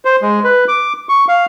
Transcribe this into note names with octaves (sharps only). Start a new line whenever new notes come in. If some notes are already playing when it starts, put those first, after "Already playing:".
C5
G#3
B4
D6
C#6
F5